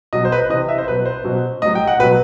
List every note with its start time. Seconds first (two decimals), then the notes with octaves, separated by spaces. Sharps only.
0.13 B2 F#3 D#5
0.25 C5
0.32 B4
0.38 C5
0.49 C3 E3 D#5
0.69 E5
0.78 C5
0.87 B2 F#3 B4
1.05 C5
1.24 B2 F#3
1.62 A2 F#3 D#5
1.75 G5
1.87 F#5
1.99 B2 F#3 B4